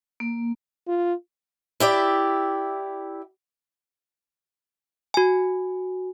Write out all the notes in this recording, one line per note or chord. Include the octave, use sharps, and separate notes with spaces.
A#3
F4
E4 G4 D5 E5
F#4 G#5